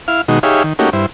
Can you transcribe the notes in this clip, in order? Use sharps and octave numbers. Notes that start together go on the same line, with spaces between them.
E4 F5 F6
B2 D#3 G#3 D#4 F#4
D#4 G4 G#4 C#5 E5 F5
D#3
A3 A#3 C#4 D#4 F#4 G4
G2 E4 C5